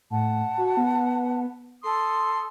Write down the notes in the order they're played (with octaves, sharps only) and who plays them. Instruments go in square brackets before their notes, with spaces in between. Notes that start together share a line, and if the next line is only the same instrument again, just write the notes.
[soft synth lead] A2 [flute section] F#5 A5
[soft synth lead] F#4
B3
[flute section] A4 D#6 [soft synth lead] C6